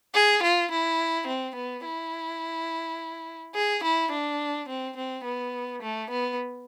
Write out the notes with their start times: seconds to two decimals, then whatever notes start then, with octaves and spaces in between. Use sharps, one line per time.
0.15 G#4
0.43 F4
0.72 E4
1.27 C4
1.56 B3
1.85 E4
3.55 G#4
3.84 E4
4.12 D4
4.69 C4
4.97 C4
5.25 B3
5.82 A3
6.10 B3